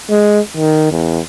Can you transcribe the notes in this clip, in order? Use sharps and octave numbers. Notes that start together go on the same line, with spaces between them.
G#3
D#3
E2